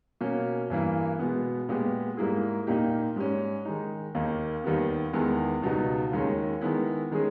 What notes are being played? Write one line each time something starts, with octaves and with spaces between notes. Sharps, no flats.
B2 A#3 C#4
G2 E3 A#3 E4
B2 G#3 B3
A#2 G#3 B3 G4
G#2 G3 A#3 E4 G#4
A#2 A#3 D#4 G4
G#2 G3 C#4
D#3 G#3 D#4
D#2 D#3 A#3 D#4
D#2 D#3 G3 B3
E2 D#3 G#3 B3 E4
C#2 B2 G3 B3 D#4
D#2 D#3 G#3 C#4
D#3 G#3 B3 E4
D#3 G#3 C#4 G#4